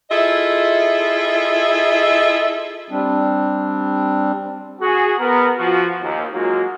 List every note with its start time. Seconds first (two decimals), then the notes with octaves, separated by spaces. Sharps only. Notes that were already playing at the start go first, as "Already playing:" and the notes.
0.10 E4 F4 G#4 A4 D#5 E5
2.90 G3 C4 D4
4.81 F#4 G#4
5.19 B3 A#4
5.57 F3 F#4
6.01 D#2
6.33 F#3 G#3 A#3 F4 F#4